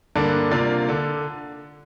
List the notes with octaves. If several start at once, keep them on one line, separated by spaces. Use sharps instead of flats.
G2 D3 A#3 D4
C3 A#3 F4 D5
D3